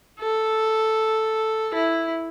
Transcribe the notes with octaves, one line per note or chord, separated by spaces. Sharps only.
A4
E4